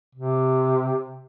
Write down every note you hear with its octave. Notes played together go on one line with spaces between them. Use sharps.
C3